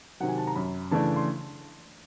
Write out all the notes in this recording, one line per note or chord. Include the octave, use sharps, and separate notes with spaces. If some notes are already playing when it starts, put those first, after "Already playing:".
C3 D#3 F#3 F#5
G#5
A5
A#5
F#2 B5
C#3 E3 A3 D4 A5
C6